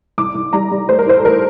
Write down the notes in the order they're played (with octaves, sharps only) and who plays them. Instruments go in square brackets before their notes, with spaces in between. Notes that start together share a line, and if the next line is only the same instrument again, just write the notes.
[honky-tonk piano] C2 D6
C2
G3 A#5
G3
A3 C5
A#4
A2 C5
A4
A3 A#4